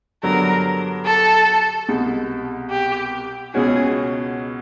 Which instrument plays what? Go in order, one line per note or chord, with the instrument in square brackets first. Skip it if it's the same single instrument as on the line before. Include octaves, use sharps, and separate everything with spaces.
[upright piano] G2 D3 F#3 B3 D4 [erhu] A#4
[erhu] A4
[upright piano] C2 B2 G#3
[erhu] G4
[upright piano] C#2 B2 G#3 C#4 F#4 [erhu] G#4